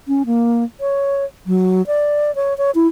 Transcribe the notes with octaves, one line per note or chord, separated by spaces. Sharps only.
C#4
A#3
C#5
F#3
D5
C#5
C#5
E4